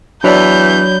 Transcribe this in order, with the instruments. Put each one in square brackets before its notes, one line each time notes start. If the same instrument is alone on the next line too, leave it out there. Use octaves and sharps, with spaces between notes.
[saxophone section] E2 E3 [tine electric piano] F#3 B5 [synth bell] D4 C#5 D5 [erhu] G6